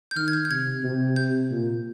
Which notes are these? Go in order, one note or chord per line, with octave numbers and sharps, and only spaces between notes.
G6
D#3 F6
G#6
G6
G6
C3 G#6
C3
G6
A#2